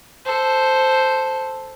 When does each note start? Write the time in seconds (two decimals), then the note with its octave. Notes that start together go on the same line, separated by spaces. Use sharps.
0.25 A4 C5